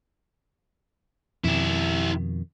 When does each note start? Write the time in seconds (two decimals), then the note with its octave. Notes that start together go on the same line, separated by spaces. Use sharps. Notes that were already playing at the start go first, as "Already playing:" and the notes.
1.44 F2 B2 D#3 E4 G4